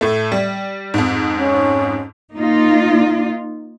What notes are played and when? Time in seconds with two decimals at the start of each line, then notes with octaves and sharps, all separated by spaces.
0.01 A2 A3
0.32 G3
0.94 F2 G#2
1.35 C#4
2.33 A#3 D#4 F4